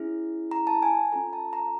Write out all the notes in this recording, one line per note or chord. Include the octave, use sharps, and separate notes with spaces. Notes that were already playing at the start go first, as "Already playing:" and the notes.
Already playing: C#4 E4 G#4
A#5
A5
G#5
C#4 F4 A4 A#5
A5
A#5